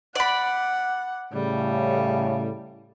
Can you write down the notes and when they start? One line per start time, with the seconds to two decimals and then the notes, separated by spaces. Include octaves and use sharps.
0.15 D5 F#5 B5
1.33 A2 C#3 G3